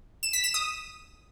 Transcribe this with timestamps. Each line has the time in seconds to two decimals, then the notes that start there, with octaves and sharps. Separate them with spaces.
0.23 E7
0.33 B6
0.44 E7
0.54 D#6